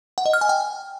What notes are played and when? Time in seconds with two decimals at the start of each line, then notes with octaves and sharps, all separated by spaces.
0.18 F#5
0.26 D#5
0.33 F6
0.41 G#5
0.49 G5